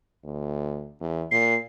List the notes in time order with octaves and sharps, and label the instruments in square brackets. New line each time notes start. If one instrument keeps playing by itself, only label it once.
[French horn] D2
E2
[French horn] A#2 [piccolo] C7